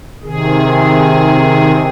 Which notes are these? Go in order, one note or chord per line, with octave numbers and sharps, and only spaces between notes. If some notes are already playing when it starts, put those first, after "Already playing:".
C3 D#3 G#4